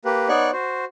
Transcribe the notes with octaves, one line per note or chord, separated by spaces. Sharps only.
A#3 G4 B4
B3 D#4 C#5 D5 C#6 F#6
F#4 C5